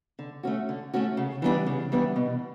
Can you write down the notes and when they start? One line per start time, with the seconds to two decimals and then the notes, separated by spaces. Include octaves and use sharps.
0.19 D3
0.43 A3 C#4 F#4
0.69 D3
0.93 A3 C#4 F#4
1.17 C#3
1.42 E3 G3 B3 D4
1.66 C#3
1.92 E3 G3 B3 D4
2.16 B2